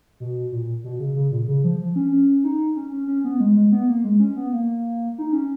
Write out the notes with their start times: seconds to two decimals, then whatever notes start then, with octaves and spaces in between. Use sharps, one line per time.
0.20 B2
0.52 A#2
0.84 B2
1.00 C#3
1.16 C#3
1.32 A#2
1.48 C#3
1.64 F3
1.80 F3
1.96 C#4
2.12 C#4
2.44 D#4
2.76 C#4
2.92 C#4
3.07 C#4
3.24 B3
3.40 G#3
3.56 G#3
3.72 B3
3.88 A#3
4.04 G#3
4.19 C#4
4.36 B3
4.52 A#3
5.18 D#4
5.33 C#4